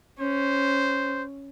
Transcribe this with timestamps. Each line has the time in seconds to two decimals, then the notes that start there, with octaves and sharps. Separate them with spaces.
0.19 C#4 C5